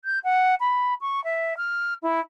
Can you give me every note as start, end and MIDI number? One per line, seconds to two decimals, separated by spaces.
0.04 0.19 91
0.24 0.54 78
0.60 0.94 83
1.01 1.22 85
1.24 1.53 76
1.57 1.94 89
2.02 2.20 64